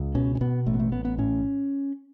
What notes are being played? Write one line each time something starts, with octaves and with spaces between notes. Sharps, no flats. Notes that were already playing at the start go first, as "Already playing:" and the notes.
Already playing: C#2
B2 C#4
C#4
B2 B3
A1 A3
B3
A3
A1 B3
B3
A2 C#4